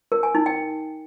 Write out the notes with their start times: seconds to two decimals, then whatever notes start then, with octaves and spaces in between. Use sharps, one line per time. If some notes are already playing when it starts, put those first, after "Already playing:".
0.12 A#4
0.23 G#5
0.35 D#4
0.46 G5